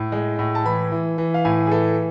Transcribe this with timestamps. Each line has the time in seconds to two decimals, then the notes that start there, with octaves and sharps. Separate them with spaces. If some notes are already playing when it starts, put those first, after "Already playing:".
Already playing: A2
0.12 G#3
0.39 A2
0.55 A5
0.65 E3 B5
0.92 E3
1.18 E3
1.34 F5
1.45 A2 G#5
1.67 G#4
1.71 E3 A4